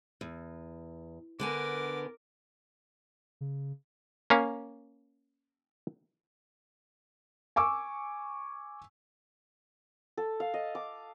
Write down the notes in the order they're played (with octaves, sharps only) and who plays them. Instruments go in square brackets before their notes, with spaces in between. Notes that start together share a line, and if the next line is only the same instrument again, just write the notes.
[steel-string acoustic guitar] E2
[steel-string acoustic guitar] D3 B3 G#5 [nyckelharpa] A#4 D6
[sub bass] C#3
[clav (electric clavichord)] A#3 C#4 F5
[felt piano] G#5 C#6 D6 E6
[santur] A4
F5
D#5
D6